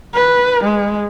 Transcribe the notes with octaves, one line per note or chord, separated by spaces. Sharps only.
B4
G#3